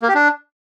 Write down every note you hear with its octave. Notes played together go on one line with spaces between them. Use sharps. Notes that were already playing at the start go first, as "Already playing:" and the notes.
A#3
G4
D4